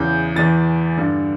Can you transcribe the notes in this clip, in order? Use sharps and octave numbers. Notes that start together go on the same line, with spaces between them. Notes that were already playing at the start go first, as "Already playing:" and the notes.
Already playing: E2 C#3 E3 G6
E2 E3 A6
G2 D3